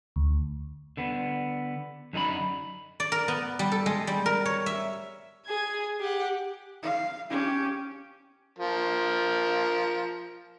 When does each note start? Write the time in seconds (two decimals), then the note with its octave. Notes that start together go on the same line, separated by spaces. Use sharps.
0.16 D2
0.97 D3 B3
2.13 F#2 D3 D#4 G#4 B5
3.00 D5
3.12 A#4
3.28 B3
3.59 G3
3.72 A4
3.86 G#3
4.07 G3
4.26 A#4
4.45 C#5
4.66 E5
5.46 G#4 G#6
6.00 G4 F#5
6.83 F5
7.30 C#4 G4
8.59 F3 A#4